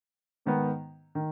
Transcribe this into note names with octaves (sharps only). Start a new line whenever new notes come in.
G#2 D#3 B3
D#3